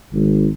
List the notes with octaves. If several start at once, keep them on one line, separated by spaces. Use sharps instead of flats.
G#1